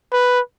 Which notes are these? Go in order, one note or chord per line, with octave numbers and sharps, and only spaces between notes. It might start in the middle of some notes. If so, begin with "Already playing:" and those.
B4